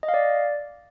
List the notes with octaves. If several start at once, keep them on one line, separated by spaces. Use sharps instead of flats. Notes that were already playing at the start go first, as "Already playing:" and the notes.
D#5
F5
D5